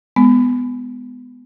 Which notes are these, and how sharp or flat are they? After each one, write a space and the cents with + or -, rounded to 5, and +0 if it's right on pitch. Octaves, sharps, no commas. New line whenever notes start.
G#3 +0 B3 +10